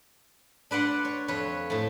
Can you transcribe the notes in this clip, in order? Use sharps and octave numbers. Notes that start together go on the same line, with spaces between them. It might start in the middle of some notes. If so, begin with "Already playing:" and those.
D4 B4 D5 F#5 C6
C#5
F2 B4 C#5
A2 A3